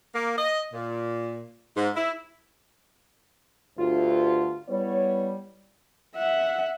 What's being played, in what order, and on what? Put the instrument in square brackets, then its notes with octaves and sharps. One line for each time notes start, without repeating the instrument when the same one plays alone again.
[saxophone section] A#3
D#5
A#2
G#2
E4
[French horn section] D2 G2 [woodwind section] F4
[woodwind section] G3 [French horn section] B3 E4 C#5
[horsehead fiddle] E5 F#5